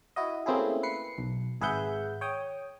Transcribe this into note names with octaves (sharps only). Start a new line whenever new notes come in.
E4 F#4 D#5
A3 A#3 C4 C#4 E4 G#4
B4 C7 C#7
B1
G#1 G#4 B4 E5 F#5 G6
C#5 G5 D#6